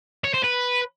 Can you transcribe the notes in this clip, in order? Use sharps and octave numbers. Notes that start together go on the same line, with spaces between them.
C#5
C5
B4